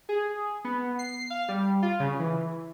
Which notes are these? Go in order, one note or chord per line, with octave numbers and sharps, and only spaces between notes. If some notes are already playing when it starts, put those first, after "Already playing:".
G#4
B3
C7
F5
G3
F4
C#3
E3